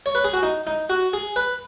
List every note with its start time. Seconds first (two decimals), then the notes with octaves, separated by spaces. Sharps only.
0.06 C#5
0.15 B4
0.24 G#4
0.34 F#4
0.43 D#4
0.67 D#4
0.90 F#4
1.13 G#4
1.36 B4